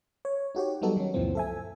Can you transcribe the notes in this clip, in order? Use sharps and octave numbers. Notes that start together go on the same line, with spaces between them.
C#5
D#4 F#4 G4 C#5
F#3 G3 B3 D#4 F#4 A4
D#3 C#4
C#2 F#2 A#2 E3 F3 C4
A4 E5 G#5